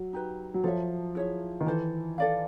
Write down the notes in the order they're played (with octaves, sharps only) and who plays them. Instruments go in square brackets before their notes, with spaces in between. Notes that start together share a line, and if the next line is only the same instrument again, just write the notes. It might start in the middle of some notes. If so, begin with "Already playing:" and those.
Already playing: [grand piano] F#3
[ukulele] D#4 G4 B4
[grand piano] F#3
[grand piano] F3 [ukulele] A4 C#5 E5
[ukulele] E4 G#4 C#5 E5
[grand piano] D#3
[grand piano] E3 [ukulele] E4 A4 C5
[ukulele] A4 D5 F5